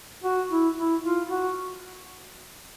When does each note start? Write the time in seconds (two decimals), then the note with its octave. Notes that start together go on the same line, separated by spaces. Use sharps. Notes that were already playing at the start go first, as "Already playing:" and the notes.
0.24 F#4
0.50 E4
0.77 E4
1.04 F4
1.30 F#4